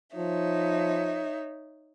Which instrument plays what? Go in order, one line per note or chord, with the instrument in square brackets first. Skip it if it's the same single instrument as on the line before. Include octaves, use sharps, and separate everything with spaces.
[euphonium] F3 [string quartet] D#4 C#5 E5